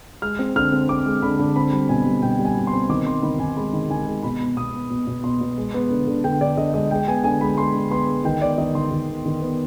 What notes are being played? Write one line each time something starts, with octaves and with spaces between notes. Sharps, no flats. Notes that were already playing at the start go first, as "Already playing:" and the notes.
G#3 F6
C4
D3 F6
C4
C4 D6
G#3
D3 B5
D3
C4 B5
G3
B2 G#5
G3
B2 G5
G3
G#5
B2
C6
C4
D#3 D6
C4 C6
D#3 B5
D#3 G#5
G#3 B5
D#3
D#3 G#5
G#3
B2 B5
B3
B2 D#6
B3
B2
B2
B2 C6
B2
G#3
B3
D3
D3
D3 G5
D3 D5
D3 D#5
G#3 D#5
G#3 G5
B3 G#5
D3 G#5
G#3 B5
G#3 C6
D3
B3 C6
G#3
D#3 G5
B3 D5
D#3 D#5
D#3 C6
D#3
B3
D#3
B3